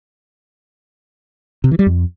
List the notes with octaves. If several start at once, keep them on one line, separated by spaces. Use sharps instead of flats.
C3
E3
G3
F2